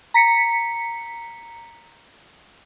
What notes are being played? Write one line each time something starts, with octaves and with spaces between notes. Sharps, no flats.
A#5 B6 C#7